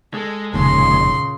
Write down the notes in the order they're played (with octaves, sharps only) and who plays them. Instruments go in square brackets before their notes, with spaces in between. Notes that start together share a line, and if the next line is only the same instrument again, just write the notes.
[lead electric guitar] G#3 [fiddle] A4
[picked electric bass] F1 D#2 [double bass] A#2 C#3 [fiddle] C6